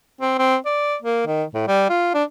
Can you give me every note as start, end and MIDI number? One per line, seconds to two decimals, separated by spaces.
0.21 0.37 60
0.39 0.56 60
0.66 0.96 74
1.03 1.22 58
1.26 1.44 51
1.54 1.63 45
1.67 1.86 55
1.89 2.12 65
2.14 2.23 62